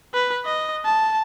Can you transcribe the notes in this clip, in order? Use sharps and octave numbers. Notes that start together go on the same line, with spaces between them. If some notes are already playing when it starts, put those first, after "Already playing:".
B4
D#5
A5